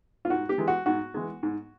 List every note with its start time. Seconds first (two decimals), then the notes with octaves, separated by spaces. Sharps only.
0.25 F4
0.30 G#2 F#4
0.49 G4
0.58 E3 G#3
0.68 F#4
0.86 G#2 F#4
1.14 E3 G#3
1.43 G#2